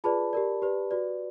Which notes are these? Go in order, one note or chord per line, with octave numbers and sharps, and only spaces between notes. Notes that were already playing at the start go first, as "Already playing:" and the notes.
F4 G#4 B4 D5 A5 B5
G4 A#4 D5
G4 B4 D5
F#4 B4 D5